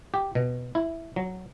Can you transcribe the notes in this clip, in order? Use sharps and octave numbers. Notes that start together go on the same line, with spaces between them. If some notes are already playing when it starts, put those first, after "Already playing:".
G4
B2
E4
F#3